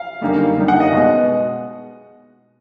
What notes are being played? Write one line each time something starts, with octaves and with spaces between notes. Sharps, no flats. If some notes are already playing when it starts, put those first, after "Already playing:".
Already playing: F5
F#2 D3 G3 A#3 D#4
F#2 D3 G3 A#3 D#4
F#5
D#5
B2 G#3 B3